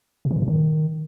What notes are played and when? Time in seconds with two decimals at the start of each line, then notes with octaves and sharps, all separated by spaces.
0.25 B2
0.31 E3
0.36 A2
0.42 A#2
0.48 D#3